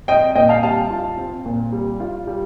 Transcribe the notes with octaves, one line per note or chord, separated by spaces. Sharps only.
C4 D#5 G5
A#2 D#5 G5
F5 A5
G3 F5 A5
F4
C4
A#2
G3
F4
G3